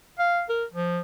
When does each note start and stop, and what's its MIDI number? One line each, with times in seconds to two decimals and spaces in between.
0.19 0.43 77
0.49 0.64 70
0.73 1.01 53